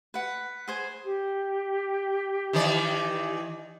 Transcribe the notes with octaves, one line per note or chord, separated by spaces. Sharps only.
B4 F#5
G#4 C5 G#5
G4
D#3 E3 D5